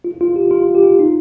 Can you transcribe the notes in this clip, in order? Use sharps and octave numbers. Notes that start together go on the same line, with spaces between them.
F4
F4
G4
F4
G4
F4
D#4